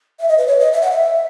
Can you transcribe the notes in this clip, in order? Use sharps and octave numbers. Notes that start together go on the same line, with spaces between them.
E5
D#5
B4
C#5
D#5
E5
F#5
E5